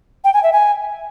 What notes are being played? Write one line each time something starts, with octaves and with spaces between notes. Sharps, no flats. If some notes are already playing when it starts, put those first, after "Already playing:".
G5
G#5
E5
G#5